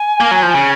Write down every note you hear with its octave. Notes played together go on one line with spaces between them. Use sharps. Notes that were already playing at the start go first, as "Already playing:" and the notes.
Already playing: G#5
A#3
F#3
F3
C#3